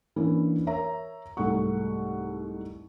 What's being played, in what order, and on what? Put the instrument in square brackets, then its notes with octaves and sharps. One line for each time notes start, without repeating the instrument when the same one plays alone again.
[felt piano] E3 A#3 C#4 D4
A#4 C#5 E5 A#5
C2 G#2 A3 F#5 C#6